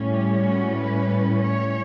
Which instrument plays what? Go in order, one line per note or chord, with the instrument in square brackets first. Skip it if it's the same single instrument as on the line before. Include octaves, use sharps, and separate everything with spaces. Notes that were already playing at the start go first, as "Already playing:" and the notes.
Already playing: [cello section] A2 G3 C#4
G4
F#4
B4
C#5